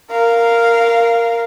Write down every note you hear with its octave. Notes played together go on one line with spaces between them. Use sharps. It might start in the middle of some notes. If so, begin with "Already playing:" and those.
A#4 F5